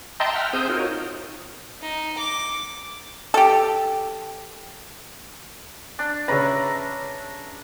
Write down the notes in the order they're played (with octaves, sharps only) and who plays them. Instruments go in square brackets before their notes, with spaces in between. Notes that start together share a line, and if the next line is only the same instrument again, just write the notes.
[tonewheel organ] D#5 E5 G5 A5 A#5 C6
E5 F#5 G5 F6
C4 G#4 C5 D#6 G6
D#4 F4 F#4 A#4 C#5
[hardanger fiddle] D#4
D6
[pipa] G4 A4
[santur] D4
[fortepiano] C#3 C#4 B4 [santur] E5 A#5